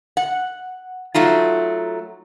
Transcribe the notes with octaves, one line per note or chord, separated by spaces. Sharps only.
F#5
F#3 A3 D#4 F4